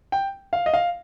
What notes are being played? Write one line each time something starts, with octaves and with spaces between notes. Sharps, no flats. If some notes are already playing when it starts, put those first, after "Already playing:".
G5
F5
D#5
F5